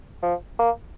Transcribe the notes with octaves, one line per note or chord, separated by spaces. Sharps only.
F3
A#3